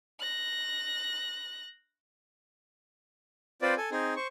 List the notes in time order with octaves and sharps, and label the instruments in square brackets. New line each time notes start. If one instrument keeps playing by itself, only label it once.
[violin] F#6 A#6
[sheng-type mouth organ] C4 F4 B4 C5 D5
A4 G#5
C4 D#4 G#4
C5 C#6